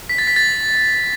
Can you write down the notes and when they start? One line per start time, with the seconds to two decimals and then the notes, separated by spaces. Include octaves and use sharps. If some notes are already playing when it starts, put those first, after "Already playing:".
0.09 B6
0.18 A6
0.27 B6
0.36 A6